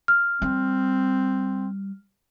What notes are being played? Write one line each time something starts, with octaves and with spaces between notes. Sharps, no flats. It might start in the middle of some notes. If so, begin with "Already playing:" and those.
F6
G3 C4